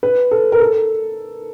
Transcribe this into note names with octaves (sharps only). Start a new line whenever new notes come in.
B4
A4
A#4
A4